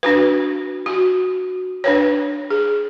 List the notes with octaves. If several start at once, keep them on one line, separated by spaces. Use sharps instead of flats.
D4 F#4 B4
F#4
D4 B4 C#5
G#4